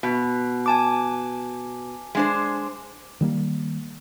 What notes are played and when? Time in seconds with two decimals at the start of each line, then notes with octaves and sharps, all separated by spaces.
0.03 B2
0.66 G#5 A5 D6
2.15 G#3 D4 C5
3.21 D#3 G3 A#3